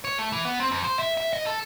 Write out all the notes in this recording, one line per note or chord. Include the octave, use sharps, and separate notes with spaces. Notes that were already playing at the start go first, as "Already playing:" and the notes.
C#5
A3
E3
B3
C4
F2
C5
E5
E5
D#5
A4